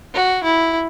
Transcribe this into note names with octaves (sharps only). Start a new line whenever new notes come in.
F#4
E4